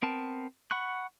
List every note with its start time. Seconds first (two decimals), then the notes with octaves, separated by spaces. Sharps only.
0.02 B3 C4 A#4 A5
0.71 F#5 B5 C#6 F#6